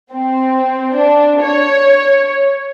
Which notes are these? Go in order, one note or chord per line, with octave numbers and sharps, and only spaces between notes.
C4
D4
C#5